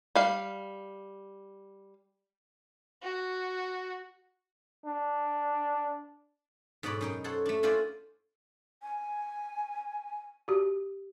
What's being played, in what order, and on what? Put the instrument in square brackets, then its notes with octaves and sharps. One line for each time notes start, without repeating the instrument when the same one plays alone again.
[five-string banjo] G3 F5
[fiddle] F#4
[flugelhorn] D4
[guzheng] G#2 B2 B4 C#5 D5 B5
F#2 D#4 G5
A4 C5 C#5 F#5
A3 D4
C#4 E4 F4 B4 C5 D5
[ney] G#5
[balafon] F#4 G4